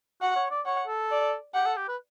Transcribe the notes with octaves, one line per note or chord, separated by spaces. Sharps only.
F#4 F#5
C#5
D5
C#5 F#5
A4
D5
G4 F#5
A4
G4
B4